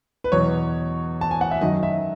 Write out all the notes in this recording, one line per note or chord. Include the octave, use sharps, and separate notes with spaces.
B4
E2 B2 F#3 C#5
A5
G#5
F#5
E5
F#2 D#3 F#3 D#5
E5